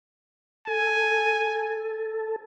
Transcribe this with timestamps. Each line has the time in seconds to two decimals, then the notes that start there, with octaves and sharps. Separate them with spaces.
0.67 A4 G#5